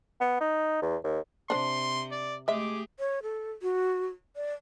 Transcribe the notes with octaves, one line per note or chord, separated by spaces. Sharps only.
B3
D#4
E2
D#2
C3 D4 C5 C6
D5
G#3 A3 G4 G#4 E5 D6
C#5
A4
F#4
D5